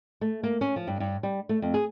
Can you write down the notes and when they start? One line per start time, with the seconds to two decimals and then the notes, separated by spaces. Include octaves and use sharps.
0.21 A3
0.43 A#3
0.61 C#4
0.76 F3
0.87 G2
1.00 G2
1.23 G3
1.49 A3
1.62 F2
1.74 G#4